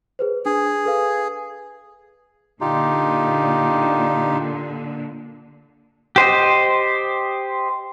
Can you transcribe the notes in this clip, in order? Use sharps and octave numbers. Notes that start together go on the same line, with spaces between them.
G#4 B4 C5
D4 G#4
A4 B4 F5
A#2 D3 D#4 F4 G4
G4 C5 D#5